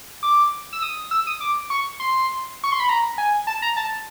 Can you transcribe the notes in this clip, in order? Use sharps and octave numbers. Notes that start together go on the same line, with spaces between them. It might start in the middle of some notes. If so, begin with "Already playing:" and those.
D6
E6
D#6
E6
D#6
D6
C#6
C6
C#6
C6
B5
A#5
G#5
A5
A#5
A5